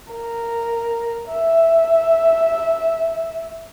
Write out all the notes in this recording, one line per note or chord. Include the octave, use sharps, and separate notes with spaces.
A#4
E5